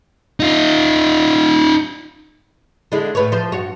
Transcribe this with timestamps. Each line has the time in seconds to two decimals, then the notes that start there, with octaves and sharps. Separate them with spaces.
0.40 D#4 F4
2.92 D3 G#3 E4
3.15 A2 B4 C#5
3.32 F3 C5
3.52 G2 F#4 C#5